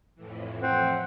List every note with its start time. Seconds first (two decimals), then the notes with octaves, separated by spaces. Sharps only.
0.15 F2 A2 E3
0.63 C4 F#5